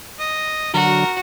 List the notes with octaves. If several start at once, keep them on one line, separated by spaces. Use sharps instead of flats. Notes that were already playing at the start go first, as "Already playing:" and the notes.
D#5
D3 F#3 F#4 A#4